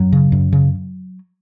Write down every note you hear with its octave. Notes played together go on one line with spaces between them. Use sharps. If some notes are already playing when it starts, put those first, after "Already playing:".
Already playing: F#2 F#3
C#3
F#2
C#3